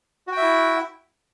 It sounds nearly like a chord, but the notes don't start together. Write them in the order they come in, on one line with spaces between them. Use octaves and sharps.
F#4 G5 E5 E4